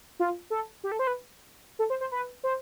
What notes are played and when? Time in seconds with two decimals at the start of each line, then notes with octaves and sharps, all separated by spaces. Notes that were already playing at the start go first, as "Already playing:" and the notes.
0.20 F4
0.50 A4
0.84 G4
0.92 A4
0.99 C5
1.07 B4
1.79 A4
1.90 C5
2.01 C5
2.12 B4
2.44 C5